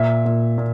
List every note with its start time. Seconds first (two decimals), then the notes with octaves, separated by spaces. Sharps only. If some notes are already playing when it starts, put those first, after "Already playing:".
Already playing: A#2 E5
0.25 A#2
0.58 A#2